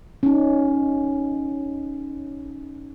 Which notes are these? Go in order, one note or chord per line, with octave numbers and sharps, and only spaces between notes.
C#4 D#4